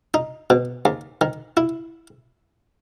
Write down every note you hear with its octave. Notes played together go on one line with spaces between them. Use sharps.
D#4
B2
D#2
D#3
E4